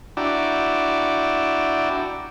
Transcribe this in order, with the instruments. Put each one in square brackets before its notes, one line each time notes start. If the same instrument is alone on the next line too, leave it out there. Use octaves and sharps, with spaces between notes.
[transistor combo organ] D4 E4 F#4 D5 G5 A#5